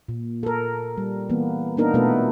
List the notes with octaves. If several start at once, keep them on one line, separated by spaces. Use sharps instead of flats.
A#2
A4 A#4
G3
E3 A#3 B3
A#3 B3 D4 D#4 A#4
B2 A3 B3 F4 A4 B4